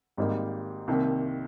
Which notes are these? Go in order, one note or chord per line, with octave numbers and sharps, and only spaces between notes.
G#1 G#2 G3 A#3 D#4
C2 C3 D#3 A#3